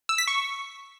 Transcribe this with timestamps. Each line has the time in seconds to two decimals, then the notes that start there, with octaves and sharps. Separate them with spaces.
0.09 E6
0.18 B6
0.28 C#6